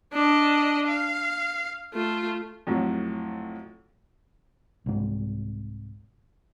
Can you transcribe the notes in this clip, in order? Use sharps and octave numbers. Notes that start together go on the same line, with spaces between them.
D4 D#5
F5
A3 F4
F2 A2 F#3
C2 G#2